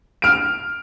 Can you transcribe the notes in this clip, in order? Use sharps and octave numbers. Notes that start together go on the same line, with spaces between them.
F6 D7